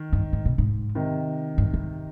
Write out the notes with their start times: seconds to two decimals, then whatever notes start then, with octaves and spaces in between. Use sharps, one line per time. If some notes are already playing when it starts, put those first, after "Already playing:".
Already playing: D#3
0.13 G2
0.33 G#2
0.45 B2
0.58 G#2
0.95 C3 D#3
1.58 G2
1.73 G2